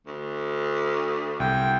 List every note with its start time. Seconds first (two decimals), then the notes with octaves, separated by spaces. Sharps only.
0.07 D2
1.40 C2 G5